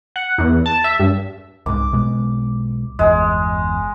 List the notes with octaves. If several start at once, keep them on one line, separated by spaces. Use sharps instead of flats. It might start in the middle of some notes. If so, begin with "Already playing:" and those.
F#5
E2
A5
E5
G2
C2 G#2 D6
B1 B2 G#3
G1 E2 G#3